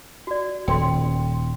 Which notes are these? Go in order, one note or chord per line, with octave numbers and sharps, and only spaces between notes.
F#4 D5
D#1 G5 C6